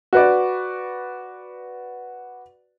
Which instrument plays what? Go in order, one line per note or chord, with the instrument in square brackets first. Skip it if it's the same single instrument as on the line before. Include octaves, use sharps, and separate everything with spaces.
[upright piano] F#4 B4 D5